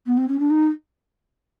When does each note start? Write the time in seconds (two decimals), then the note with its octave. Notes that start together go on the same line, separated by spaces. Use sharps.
0.06 B3
0.17 C4
0.28 C#4
0.39 D4
0.50 D#4